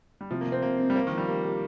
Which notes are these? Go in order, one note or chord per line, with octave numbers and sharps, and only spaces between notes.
G3
C3 F3
A#3
C3
C4
C3 A#3
C4
G3
A#3 C5
D#3 F3
G3
A#3 G4
G4